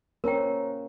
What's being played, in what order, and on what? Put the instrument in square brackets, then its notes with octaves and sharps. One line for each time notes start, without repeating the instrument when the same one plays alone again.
[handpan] A#3 C#4 [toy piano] A#4 G5 [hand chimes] C5 C#5 A#5